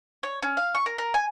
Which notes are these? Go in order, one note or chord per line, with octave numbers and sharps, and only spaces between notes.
C#5
C#4
F5
C#6
A#4
A#4
G#5